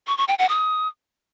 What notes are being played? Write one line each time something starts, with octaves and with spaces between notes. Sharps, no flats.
C#6
C#6
G5
F#5
D#6